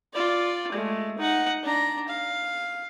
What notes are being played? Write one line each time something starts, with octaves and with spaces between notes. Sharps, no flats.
F4 D5
G#3 A3
D#4 F#5
D4 A#5
F5